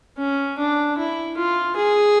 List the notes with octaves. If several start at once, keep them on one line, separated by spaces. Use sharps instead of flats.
C#4
D4
E4
F4
G#4